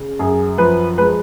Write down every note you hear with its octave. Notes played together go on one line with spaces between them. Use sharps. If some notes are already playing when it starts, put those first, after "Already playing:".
Already playing: C#3
F#2 G#4
F3 B4
G#3 B4